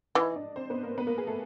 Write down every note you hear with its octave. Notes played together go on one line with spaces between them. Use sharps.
E3 D#4 D#5
D#5
D4 D5
C4 C5
B3 B4
A#3 A#4
B3 B4
A#3 A#4
G#4
A3 A4